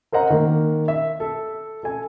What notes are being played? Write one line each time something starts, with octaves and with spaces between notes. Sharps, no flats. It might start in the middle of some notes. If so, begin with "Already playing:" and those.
A#4 C5 D#5 F#5 A#5
D#3 A#3
E5
A4
A4 G#5